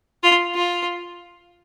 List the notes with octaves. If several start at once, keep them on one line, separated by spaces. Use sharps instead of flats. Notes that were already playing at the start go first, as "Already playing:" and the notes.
F4
F4